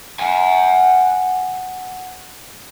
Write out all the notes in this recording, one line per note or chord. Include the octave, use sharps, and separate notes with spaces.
F#5 G#5